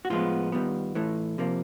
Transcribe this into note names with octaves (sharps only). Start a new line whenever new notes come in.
F#4
A2 F3 G#3 B3 F4
D#3 G3 B3
A2 E3 A3
C3 F3 A#3